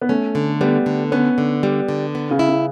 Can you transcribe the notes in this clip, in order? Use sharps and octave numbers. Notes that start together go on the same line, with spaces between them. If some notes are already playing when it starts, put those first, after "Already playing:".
B3
A3 C#4
D3
G3 B3
D3
B3 C#4
D3
G3
D3
B3
C#3
E4
C#3